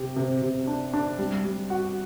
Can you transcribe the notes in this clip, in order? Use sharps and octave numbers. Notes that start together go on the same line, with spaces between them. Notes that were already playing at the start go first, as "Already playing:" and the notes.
Already playing: C3 G4
C3
C3
D4
D4
G3
G3
F#4